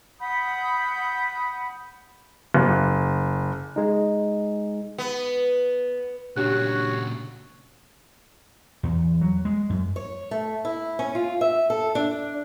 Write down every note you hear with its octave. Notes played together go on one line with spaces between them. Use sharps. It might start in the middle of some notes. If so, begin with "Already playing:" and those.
F#5 B5 D#6 G6
F#1
G#3 D#4
B3
A#2 C#3 D4 F#4 G4 C#5 F#6
E2
F#3
G#3
F#2
C#5
A3
E4
C#4
F4
E5
A4
D4